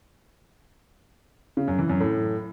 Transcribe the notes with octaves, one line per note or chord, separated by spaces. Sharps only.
C#3
F#2
E3
F#2
A2